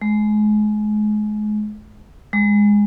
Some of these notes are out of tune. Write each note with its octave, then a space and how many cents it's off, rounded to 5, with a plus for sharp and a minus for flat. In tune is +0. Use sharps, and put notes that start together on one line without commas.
G#3 +30
G#3 -10